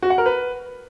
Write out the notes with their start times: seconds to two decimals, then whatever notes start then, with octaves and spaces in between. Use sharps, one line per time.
0.03 F#4
0.10 F#5
0.18 A#4
0.26 B4